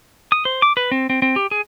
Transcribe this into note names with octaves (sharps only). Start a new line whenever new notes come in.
D#6
C5
D6
B4
C4
C4
C4
G4
G#4